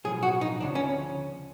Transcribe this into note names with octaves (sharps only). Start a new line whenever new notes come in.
B1 A2 F3 G#4
F#4
D#4
D2 C#3 F3 D4
C#4